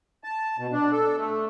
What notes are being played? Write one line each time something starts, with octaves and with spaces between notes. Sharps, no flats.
A5
B2
D4
A4
A3